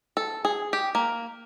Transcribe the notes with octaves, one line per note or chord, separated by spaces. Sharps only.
A4
G#4
G4
A#3